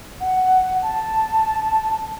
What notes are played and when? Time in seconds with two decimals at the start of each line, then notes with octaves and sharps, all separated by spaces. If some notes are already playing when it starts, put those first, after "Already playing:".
0.20 F#5
0.83 A5